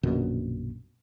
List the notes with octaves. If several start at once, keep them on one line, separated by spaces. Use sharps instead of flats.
A#1 F#2 B2 D3